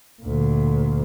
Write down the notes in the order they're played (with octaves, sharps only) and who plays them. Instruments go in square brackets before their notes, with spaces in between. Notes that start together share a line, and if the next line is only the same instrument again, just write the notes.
[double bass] D2 A#2